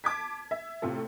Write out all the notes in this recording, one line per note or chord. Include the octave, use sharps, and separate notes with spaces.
A5 D6 G#6 B6
E5
A2 C3 A3 F4 A4